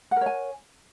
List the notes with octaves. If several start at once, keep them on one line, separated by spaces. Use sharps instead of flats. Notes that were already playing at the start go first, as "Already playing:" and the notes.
A#4 C#5 F#5 G#5